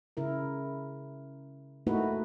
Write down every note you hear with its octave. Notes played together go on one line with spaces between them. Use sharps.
C#3 E4 A#4
A3 A#3 D#4 E4 F#4 B4